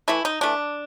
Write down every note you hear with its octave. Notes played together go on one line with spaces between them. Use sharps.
E3 A3 E4
D#4
E3 A3 D4